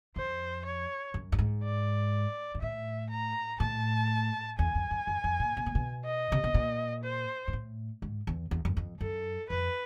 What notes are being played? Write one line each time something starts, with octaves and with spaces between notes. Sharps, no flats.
F2 C5
C#5
F#2
G2
G#2
D5
G#2
A2 E5
A#5
A2 A5
E2 G#5
F2
F#2
F#2
F2
A#2
B2
A#2
B2
D#5
C3
B2
A#2
C5
G#2
A2
G#2
E2
E2
F#2
F2
F#2 A4
F2 B4